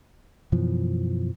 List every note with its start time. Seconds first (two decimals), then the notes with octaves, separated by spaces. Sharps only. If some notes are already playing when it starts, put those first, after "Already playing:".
0.52 F#2 B2 E3 F3